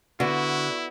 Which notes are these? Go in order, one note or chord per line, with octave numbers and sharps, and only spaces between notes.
D3 B3 E4 F#4